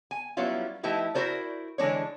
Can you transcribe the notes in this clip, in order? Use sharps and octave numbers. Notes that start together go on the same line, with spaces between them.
G#5
F#3 G3 B3 C#4 E4 F4
F3 A3 D#4 E4 G4 B4
E4 F#4 A#4 C5 D5
D3 E3 G#3 D4 C#5